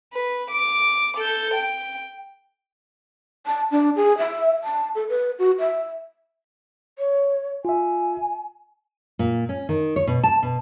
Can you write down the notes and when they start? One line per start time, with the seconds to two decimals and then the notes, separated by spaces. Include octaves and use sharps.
0.13 B4
0.51 D6 D7
1.17 A4 G6
1.54 G5
3.46 A5
3.71 D4
3.96 G#4
4.18 E5
4.64 A5
4.95 A4
5.09 B4
5.39 F#4
5.59 E5
6.98 C#5
7.65 F4 E5 G#5
9.19 A#2
9.49 C#4
9.69 D#3
9.96 C#5
10.07 B2
10.23 A5
10.43 B2